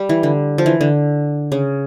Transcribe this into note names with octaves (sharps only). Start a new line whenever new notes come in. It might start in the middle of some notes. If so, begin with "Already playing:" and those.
Already playing: G3
E3
D3
F3
E3
D3
C#3